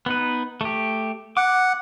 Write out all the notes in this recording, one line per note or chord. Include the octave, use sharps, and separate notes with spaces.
B3 D#4 B4
A3 G4
F#5 D6